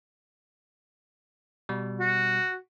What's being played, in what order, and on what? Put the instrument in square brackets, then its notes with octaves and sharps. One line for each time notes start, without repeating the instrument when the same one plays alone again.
[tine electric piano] B2 G3
[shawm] F#4